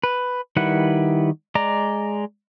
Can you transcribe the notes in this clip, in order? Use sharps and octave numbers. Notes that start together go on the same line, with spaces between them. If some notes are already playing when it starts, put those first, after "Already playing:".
B4
D#3 G3 E4 B4 F#5
G#3 D5 A#5